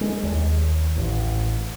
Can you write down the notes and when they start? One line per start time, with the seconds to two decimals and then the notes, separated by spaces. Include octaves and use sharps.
0.01 G#3
0.23 D#2
0.96 A1